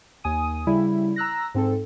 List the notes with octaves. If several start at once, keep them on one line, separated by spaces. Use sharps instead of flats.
D#2 G#5 D#6 D#7
C#3 G3 E4
A#5 E6 F#6 A#6
G#2 C4 A4